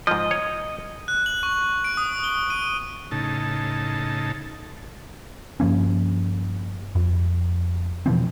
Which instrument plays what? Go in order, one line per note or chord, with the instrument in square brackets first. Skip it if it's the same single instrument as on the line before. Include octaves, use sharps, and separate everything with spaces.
[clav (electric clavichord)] G#2 F3 [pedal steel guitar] D#5
[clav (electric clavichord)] C#5
[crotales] F#6
F#7
C#6
D7
D#6
G7
D#7
[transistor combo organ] A2 C#3 D#4 A5
[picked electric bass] G2 F3 A#3 C#4
F2
B2 E3 F3 C4